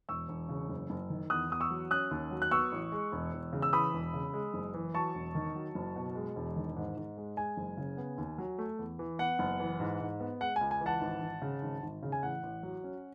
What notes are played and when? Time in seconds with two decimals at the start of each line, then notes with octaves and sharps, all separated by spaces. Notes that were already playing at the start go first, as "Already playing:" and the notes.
0.09 E1 C#6 E6
0.29 E1
0.49 C#3
0.69 F#1
0.90 F#1
1.10 D#3
1.30 E2 D#6 F#6
1.50 E2 D#6
1.60 C#6 E6
1.70 F#3
1.91 C#4 D#6 F#6
2.11 D#2
2.31 F#3
2.42 F#6
2.51 B3 C#6 E6
2.72 A1
2.92 G#3
3.12 E1
3.32 E1
3.53 C#3
3.62 E6
3.73 E3 B5 D#6
3.93 E1
4.14 C#3
4.34 G#3
4.54 F#1
4.74 E3
4.94 F#3 A5 C#6
5.15 E1
5.35 D#3
5.55 F#3
5.75 F#1
5.96 B2
6.15 G#3
6.36 E1
6.56 D#3
6.76 G#2
6.97 G#2
7.17 G#3
7.37 G#3 G#5
7.57 F#1
7.77 C#3
7.97 B3
8.18 D#2
8.38 F#3
8.58 A3
8.79 E2
8.99 E3
9.19 B3 F#5
9.39 F#1
9.60 E3
9.80 G#2
10.00 G#2
10.20 B3
10.41 G#3 F#5
10.56 C#2 G#5
10.71 G#5
10.81 E3
10.86 F#5 A5
11.01 G#1
11.22 G#1
11.42 C#3
11.62 G#1
11.82 G#1
12.03 C#3
12.12 G#5
12.23 A1 F#5
12.43 A1
12.63 F#3
12.84 C#4